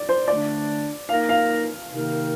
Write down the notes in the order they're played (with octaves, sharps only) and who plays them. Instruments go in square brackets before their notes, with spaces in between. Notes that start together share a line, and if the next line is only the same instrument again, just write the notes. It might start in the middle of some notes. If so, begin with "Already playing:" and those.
Already playing: [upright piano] D5
C5
[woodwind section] D3 A3 D4 [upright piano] D5
[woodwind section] A#3 D#4 A#4 [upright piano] F5
[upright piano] F5
[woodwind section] C3 D#3 A#3 D#4 A#4